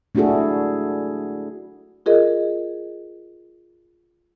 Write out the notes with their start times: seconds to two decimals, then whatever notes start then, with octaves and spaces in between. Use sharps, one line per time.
0.15 A3 D4 E4 F#4 G#4 A4
2.06 F4 G#4 A#4 D#5